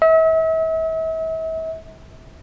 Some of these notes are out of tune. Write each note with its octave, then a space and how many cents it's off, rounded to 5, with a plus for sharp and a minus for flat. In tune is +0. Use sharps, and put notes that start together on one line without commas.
E5 -40